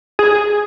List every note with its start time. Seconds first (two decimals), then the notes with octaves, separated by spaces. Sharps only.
0.19 G#4